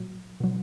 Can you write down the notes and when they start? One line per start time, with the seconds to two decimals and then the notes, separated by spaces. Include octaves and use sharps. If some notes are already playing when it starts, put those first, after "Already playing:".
Already playing: A#2 F#3
0.40 B2 F#3